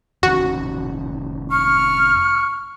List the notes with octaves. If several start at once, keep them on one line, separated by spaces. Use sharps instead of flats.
F1 D#3 C#4 F#4
C#6 F6